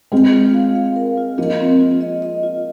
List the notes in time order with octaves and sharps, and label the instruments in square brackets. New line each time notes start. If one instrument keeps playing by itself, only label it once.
[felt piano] G#3 C4 [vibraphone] F4
[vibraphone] F4
F5
F5
A#4
F4
[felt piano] F3 A#3 [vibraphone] D#5
[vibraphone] C4
F4
D#5
D#5
F4